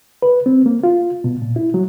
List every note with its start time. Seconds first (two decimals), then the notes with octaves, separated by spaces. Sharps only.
0.22 B4
0.46 C4
0.66 A#3
0.84 F4
1.24 B2
1.42 A#2
1.56 E4
1.74 F#3